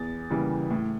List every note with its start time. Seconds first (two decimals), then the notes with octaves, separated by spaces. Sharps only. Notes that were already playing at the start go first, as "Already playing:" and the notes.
Already playing: E2 A6
0.30 C#3 E3 G3 A#3
0.70 A2